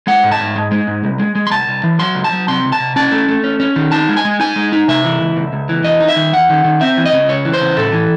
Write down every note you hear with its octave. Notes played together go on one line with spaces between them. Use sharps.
G#3 F#5
G#2
A5
G#2
G#3
G#3
G#2
C2
G#3
G#3
C6
C2 A5
C2
E3
F#3 C6
C#2
A5
F#3
C3 C6
C#2
A5
C3
C#4 A5
A3
A3
C#4
C#4
D#3
D#4 A5
G#3
G#5
G#3
D#4 G#5
G#3
D#4
C3 E5
E3
C#2
C#2
C#2
E3
E2 D#5
D#4
E5
D#3
E2 F#5
D#3
D#3
C4 E5
E3
D#5
C#3
C#2 C#5
E3
C5
C#3
A2 A4
E3